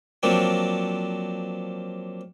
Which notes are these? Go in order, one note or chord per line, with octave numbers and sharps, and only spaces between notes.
F3 F#3 A#3 C4 D4 F#4